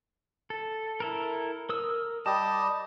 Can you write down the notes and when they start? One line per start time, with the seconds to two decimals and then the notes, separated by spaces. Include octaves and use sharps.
0.50 A4
1.00 E4 A4 A#4
1.69 A#4 D#6 E6
2.26 G3 G4 D#5 A5